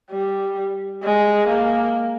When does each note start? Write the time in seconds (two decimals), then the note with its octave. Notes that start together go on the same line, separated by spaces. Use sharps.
0.11 G3
1.03 G#3
1.48 A#3